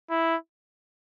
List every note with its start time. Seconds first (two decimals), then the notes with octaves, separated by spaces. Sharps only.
0.10 E4